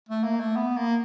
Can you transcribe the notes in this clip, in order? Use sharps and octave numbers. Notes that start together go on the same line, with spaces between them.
A3
A#3
A3
B3
A#3